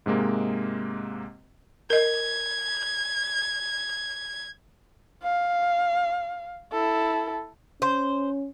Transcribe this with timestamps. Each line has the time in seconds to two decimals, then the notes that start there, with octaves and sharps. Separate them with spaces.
0.06 G#2 C3 G#3 A#3
1.90 A#4 D#5 G#6
5.23 F5
6.72 E4 A4
7.82 C#4 C5